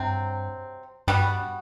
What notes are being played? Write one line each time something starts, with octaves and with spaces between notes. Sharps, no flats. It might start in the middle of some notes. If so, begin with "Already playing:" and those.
Already playing: G2 C3 F#3 C4
G2 G3 B3 F#4